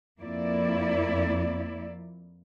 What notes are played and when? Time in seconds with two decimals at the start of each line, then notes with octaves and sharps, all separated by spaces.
0.21 F2 A#3 E4 D5